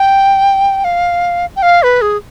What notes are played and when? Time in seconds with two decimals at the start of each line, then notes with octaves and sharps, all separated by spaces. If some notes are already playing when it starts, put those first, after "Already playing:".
Already playing: G5
0.84 F5
1.56 G5
1.62 F5
1.83 B4
2.02 G#4